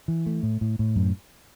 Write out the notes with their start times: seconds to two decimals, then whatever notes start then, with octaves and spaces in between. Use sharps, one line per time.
0.08 E3
0.26 A3
0.43 A2
0.61 A2
0.79 A2
0.96 F#2